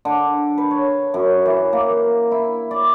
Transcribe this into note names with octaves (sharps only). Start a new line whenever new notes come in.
D3
B4
C#5
F#2
E3
A#3
E4
D5